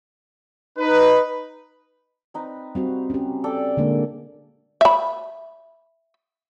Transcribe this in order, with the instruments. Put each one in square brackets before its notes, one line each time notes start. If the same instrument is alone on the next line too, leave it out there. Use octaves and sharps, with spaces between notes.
[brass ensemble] D#4 B4
[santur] C4 D#4 B4
[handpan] G3 C4 F#4 [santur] F5
[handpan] C#4 G4
[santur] A4 D5 G5
[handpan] D3 G#3 A#3
[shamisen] E5 B5